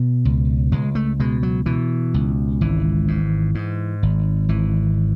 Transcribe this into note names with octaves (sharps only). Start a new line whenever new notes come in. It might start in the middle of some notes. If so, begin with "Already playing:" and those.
Already playing: B2
C#2
C#2 G#3
A3
B2 G#3
F#3
B2 E3
C#2
G#1 E3
G#2
G#2
G#1
G#1 E3